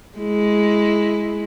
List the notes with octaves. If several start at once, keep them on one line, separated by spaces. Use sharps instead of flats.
G#3 E4